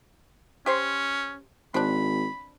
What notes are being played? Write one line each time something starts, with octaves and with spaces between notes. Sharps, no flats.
C#4 G4 C5 C6
G#1 C4 D4 B5